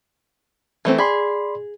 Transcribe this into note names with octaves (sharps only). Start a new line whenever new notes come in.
E3 A3 C4
G#4 D5 B5 C6